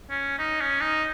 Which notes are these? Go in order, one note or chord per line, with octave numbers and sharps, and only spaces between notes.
C#4
D#4
C#4
D#4